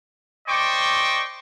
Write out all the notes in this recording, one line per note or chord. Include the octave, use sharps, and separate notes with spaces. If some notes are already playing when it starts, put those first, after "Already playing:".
C5 D5 D#5 G5 C#6 D6